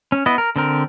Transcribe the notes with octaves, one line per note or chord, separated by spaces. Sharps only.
C#4
B3 E4 D#5
A#4
D3 C4 A#4